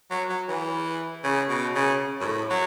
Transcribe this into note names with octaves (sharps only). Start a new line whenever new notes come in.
F#3
F#3
E3
C#3
B2
C#3
F#2
A2
F#3